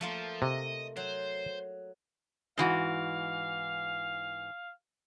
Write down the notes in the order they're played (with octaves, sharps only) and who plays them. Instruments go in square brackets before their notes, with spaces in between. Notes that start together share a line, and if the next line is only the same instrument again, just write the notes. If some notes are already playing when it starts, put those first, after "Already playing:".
[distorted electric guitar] F3 [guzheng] A3 A#3 F4
[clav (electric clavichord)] C3 [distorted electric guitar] D#5
[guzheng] F#3 [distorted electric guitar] C5
[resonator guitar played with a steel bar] G#2 E3 F#4 [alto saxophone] F5